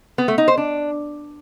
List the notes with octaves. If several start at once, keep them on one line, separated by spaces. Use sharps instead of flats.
B3
A3
D#4
C5
D4